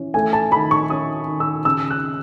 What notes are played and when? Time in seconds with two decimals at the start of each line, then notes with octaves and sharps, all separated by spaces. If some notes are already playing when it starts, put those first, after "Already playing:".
Already playing: E3 C#4
0.14 A3 G#5
0.33 A5
0.52 D#3 B5
0.71 C#6
0.90 C#4 D#6
1.28 D#3
1.40 E6
1.65 C#3 E6
1.91 F#6